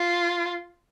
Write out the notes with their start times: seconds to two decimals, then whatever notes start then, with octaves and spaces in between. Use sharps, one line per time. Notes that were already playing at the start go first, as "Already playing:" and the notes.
Already playing: F4